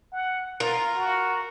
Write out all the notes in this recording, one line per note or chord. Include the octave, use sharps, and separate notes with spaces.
F#5
F4 A#4
F#4